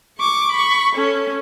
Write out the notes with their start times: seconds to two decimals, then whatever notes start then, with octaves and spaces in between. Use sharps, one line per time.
0.18 C#6 D6
0.51 B5 C#6
0.95 C#4 A4